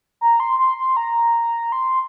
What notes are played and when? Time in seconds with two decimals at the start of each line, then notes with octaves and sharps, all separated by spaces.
0.21 A#5
0.40 C6
0.59 C6
0.78 C6
0.97 A#5
1.72 C6